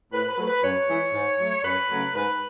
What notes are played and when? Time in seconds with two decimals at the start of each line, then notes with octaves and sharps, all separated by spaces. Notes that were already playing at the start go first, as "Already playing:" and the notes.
0.12 A2 B4
0.29 B4
0.38 F#3 A3
0.46 B4
0.62 F#2 C#5
0.89 E3 G#3
1.13 G#2
1.39 F#3 A3
1.63 F#2 B4
1.89 C#3 F#3 A3
2.14 G#2 B4